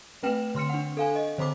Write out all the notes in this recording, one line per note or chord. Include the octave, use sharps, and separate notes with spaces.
A3 C4 B4 G5 F6 E7
D3 C6 F6 C#7
D4 F#5
A4 F5 G#5
D#5
D3 C5 B5 D6